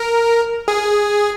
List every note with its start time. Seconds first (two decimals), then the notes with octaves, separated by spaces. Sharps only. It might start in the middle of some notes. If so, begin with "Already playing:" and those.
Already playing: A#4
0.68 G#4